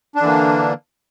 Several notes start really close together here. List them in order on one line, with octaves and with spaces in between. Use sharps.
D4 D3 E3 A#3